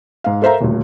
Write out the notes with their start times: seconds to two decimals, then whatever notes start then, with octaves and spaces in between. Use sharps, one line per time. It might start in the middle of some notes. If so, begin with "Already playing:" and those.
0.24 G#2 F5
0.42 A4 A#4 C5 E5 F5 A#5
0.61 D#1 D2